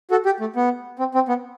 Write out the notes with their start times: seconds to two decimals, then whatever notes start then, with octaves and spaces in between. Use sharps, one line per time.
0.11 F#4 A4
0.25 G4
0.40 A3
0.56 B3
0.99 C4
1.15 C4
1.29 B3